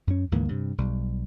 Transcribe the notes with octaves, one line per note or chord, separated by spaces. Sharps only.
F#2 C#4
D2 G#2 E3 A#3
G2 C3
B1 G3